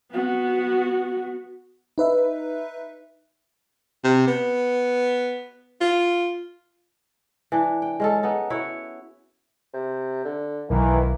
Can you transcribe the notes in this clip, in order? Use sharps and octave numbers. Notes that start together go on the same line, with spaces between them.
B3 F#4
D#4 B4 E5
C3
B3
F4
E3 D4
G5
G#3 C#4 A4
B3 D#4 A4
E4 F#4 C#5
C3
D3
B1 D#3 E3 A#3